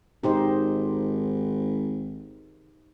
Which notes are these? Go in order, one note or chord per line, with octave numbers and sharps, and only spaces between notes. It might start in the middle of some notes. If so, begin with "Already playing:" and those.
G#1 D#4 G4 C5